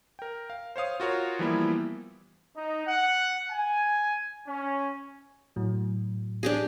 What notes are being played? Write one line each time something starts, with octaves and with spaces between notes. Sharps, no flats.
A#4 G5
F5
C5 C#5 F5 D#6
F4 F#4 A#4 C#5
E3 F3 G3 A#3 B3 E4
D#4
F#5
G#5
C#4
A2 F#3
D4 G4 G#4